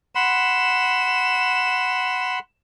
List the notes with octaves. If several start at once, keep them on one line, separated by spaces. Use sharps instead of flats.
F#5 B5 C6 E7